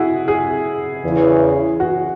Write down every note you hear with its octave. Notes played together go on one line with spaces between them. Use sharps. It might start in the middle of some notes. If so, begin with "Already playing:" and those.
Already playing: E4 F#4 G#4
G#4
E2 C#3 E3
F#4